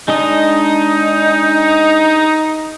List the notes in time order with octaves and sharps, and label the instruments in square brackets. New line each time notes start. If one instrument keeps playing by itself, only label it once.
[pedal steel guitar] G#3 D4 D#5 [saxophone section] D#4